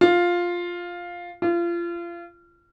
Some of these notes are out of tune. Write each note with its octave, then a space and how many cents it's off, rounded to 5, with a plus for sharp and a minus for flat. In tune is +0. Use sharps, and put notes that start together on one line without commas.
F4 +5
F4 -30